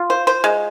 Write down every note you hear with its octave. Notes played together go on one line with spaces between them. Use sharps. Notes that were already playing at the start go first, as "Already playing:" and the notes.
Already playing: F4
C5
C5
G#3